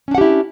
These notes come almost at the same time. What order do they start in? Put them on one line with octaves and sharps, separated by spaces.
C#4 D4 F#5 G4 E4